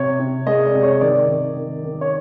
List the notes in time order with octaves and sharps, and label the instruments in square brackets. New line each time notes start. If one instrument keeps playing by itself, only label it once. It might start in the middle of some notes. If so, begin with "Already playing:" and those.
Already playing: [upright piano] C3 C#5
C3
G#3 D#5
D5
C3
C#5
D#3 D5
D#3
D#3
D#3
C#5